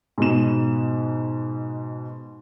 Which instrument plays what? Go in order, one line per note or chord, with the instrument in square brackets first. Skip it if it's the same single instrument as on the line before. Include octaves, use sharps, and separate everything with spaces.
[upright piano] G#2 B2 E7